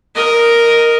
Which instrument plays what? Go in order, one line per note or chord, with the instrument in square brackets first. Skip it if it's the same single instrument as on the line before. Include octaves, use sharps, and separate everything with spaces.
[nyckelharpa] A#4 D#5